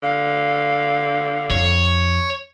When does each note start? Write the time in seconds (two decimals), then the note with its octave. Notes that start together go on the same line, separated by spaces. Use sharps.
0.03 D3 F5
1.50 F2 C#5